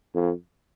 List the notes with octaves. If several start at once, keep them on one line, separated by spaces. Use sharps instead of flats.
F2